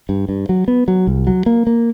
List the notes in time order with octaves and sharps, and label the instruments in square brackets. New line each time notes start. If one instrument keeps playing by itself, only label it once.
[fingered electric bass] G2
G2
F#3
B3
F#3
C2
F#3
A#3
A#3